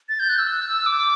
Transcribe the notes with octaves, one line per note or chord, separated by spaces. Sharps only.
A6
G6
F#6
E6
D6